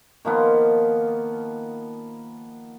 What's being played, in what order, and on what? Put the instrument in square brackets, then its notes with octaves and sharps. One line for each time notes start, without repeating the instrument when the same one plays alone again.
[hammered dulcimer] D#3 F3 A#3 B3